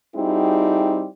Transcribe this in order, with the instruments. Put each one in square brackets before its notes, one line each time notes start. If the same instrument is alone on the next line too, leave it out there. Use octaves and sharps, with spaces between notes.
[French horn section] G3 C4 D#4 E4 F#4 G#4